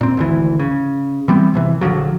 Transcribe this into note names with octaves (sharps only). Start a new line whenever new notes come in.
A#2 C4
G#1 D2 E3
C#3
E3 G3 B3 C4
G#1 C3 E3
A#1 D3 F3 F#3